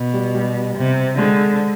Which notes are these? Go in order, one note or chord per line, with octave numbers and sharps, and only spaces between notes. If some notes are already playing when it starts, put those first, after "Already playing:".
Already playing: B2
G3
G3
C3
D3 G#3